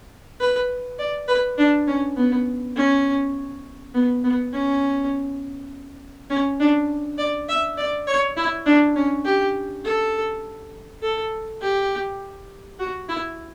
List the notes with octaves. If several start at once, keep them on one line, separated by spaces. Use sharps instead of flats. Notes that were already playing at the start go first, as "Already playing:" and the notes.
B4
D5
B4
D4
C#4
B3
C#4
B3
B3
C#4
C#4
D4
D5
E5
D5
C#5
E4
D4
C#4
G4
A4
A4
G4
F#4
E4